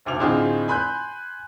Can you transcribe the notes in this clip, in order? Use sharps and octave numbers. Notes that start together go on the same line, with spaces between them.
F1 D2 D6 F7
A2 D3 C4 D#4 F4 G#4
G#5 B5 C6 F#6 G6